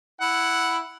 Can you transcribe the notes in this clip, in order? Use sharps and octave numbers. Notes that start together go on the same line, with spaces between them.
E4 F#5